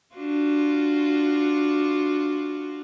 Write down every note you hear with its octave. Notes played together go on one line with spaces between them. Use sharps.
D4 F4 F#4